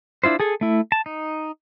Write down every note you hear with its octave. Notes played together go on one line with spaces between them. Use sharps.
D4 E4 F4 C5
G#4 A4 G#5
A3 E4
A5
D#4